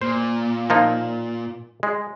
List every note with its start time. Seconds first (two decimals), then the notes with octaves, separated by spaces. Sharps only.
0.01 A#2 C5
0.70 F3 A#3 D#4
1.83 G#3